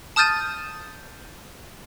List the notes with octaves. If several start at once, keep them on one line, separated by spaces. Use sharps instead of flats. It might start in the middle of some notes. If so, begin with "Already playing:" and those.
A5 D#6 F6 G6 A6 D#7